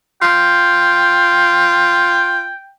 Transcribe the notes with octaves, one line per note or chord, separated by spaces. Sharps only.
F4 G5